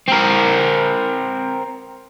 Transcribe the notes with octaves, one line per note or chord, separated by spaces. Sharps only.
C4 A#4